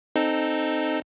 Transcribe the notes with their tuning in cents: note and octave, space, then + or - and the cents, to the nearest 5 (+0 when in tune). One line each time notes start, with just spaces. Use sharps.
C4 +0 D#4 -10 A4 +0